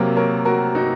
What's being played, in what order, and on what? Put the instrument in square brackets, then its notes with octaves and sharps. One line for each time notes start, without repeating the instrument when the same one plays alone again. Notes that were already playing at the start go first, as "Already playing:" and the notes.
Already playing: [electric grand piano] C3 F#3 A#3 [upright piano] A#4 C#5
[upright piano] A#4 C#5
F#4 A#4
D#4 F#4